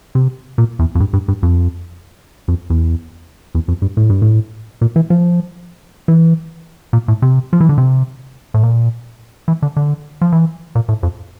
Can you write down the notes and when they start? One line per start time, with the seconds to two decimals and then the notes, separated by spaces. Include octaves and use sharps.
0.15 C3
0.58 A#2
0.79 E2
0.95 F2
1.00 G2
1.13 G2
1.28 G2
1.43 F2
2.48 F2
2.70 E2
3.55 E2
3.68 F2
3.82 G2
3.97 A2
4.10 G2
4.22 A2
4.81 A#2
4.96 E3
5.10 F3
6.08 E3
6.93 A#2
7.08 A2
7.22 C3
7.53 F3
7.60 E3
7.69 D3
7.78 C3
8.54 A2
8.63 A#2
9.48 E3
9.62 D3
9.76 D3
10.21 F3
10.32 E3
10.75 A#2
10.89 A2
11.03 F2